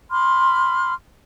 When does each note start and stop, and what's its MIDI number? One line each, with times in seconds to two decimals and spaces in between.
0.10 0.93 83
0.10 0.93 84
0.10 0.93 86
0.10 0.93 89